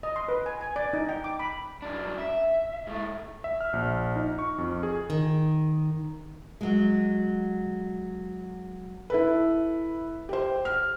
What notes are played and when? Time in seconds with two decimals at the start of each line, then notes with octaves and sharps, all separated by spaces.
0.03 D#5
0.16 C6
0.28 B4
0.46 G#5
0.61 G#5
0.76 D5
0.93 D#4
1.09 G5
1.24 D6
1.39 B5
1.82 F#2 D4
2.18 E5
2.87 G#2 A3
3.44 E5
3.61 F6
3.73 A#1
4.16 D#4
4.39 C#6
4.58 F2
4.83 G#4
5.10 D#3
6.61 F#3 G#3
9.10 E4 A4 B4
10.29 G4 C5
10.65 F6